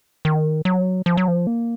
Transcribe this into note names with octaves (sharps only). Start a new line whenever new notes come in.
D#3
F#3
F3
F#3
F3
A#3